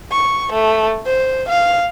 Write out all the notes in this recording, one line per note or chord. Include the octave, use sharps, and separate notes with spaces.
C#6
A3
C5
F5